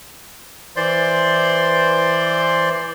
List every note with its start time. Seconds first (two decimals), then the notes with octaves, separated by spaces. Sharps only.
0.76 E3 C5 D5 C6